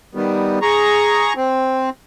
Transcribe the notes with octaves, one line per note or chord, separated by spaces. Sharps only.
D#3 G3 B3
G#4 A#5 C#6
C4